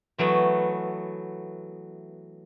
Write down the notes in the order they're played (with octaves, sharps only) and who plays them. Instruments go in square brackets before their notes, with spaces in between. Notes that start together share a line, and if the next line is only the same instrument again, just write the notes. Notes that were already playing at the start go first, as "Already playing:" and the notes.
[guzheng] E3 F#3 A3 B3